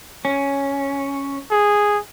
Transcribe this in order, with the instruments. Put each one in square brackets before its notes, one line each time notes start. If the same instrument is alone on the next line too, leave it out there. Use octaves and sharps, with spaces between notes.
[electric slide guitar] C#4
[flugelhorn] G#4